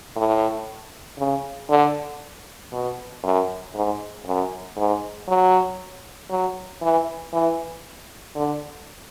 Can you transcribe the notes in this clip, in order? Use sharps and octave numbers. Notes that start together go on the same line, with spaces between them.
A2
C#3
D3
B2
F#2
G#2
F#2
G#2
F#3
F#3
E3
E3
D3